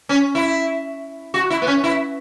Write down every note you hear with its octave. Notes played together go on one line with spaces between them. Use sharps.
C#4
E4
F#4
E4
B3
C#4
E4